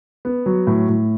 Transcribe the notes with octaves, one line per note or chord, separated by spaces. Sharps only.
B3
F#3
A2
A2